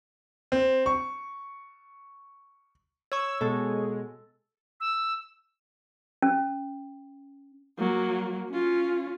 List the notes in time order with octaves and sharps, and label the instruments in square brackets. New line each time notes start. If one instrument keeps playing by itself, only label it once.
[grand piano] C4
C#6
[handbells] C#5 C#6 [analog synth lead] E6
[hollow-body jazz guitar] B2 [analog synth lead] G#3 [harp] A4
[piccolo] E6
[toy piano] C#4
[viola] F#3 A#3
C#4 F4